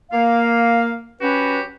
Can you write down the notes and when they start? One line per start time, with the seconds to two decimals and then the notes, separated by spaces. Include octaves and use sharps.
0.11 A#3 F5
1.21 F#3 C#4 F#4 G4 B4